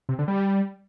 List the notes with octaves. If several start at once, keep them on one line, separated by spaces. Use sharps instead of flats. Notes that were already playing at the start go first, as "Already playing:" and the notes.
C3
D3
G3